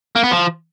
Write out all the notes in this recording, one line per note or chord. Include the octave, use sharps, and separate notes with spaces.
A#3
B3
F3